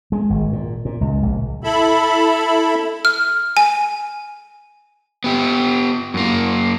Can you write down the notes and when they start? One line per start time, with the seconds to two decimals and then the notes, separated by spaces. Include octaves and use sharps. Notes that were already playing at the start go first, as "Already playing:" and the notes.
0.12 G#3
0.30 G#1
0.53 A#2
0.85 A#2
1.01 C#2
1.23 A#1
1.64 E4 A4 E5 B5
3.05 F6
3.57 G#5
5.24 B3 G4
6.14 F#2 A#3